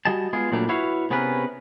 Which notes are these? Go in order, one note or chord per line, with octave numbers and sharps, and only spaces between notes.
G3 F#4 D#5 G#5 A5
G#3 B3 F4 G#4
A#2 F#3 G3 A3 D4
E4 F#4 B4 C#5 E5 F5
C3 B3 C#4 G#4 A#4 B4